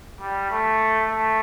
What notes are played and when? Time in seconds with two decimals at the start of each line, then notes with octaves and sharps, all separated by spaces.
0.21 G3
0.51 A3
1.08 A3